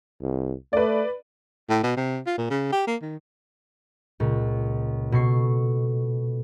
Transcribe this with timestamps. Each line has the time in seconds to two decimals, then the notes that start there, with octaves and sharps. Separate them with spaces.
0.22 C2
0.73 A3 B4 D5
1.69 A2
1.83 B2
1.97 C3
2.27 F4
2.38 A#2
2.50 C#3
2.72 G4
2.87 A#3
3.02 D#3
4.20 C#2 A#2
5.12 B2 A4 C#6 C7